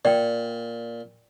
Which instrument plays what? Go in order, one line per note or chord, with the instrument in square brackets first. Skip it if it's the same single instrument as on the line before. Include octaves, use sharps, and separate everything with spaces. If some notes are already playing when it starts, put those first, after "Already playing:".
[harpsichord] A#2 [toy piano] D5 G5